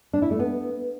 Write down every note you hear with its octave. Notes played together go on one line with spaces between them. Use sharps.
D4
E4
A3
B3